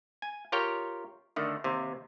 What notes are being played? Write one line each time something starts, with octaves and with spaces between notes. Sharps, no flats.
G#5
F4 G4 A#4 C#5 G5
D3 D#3 A3
D#2 C3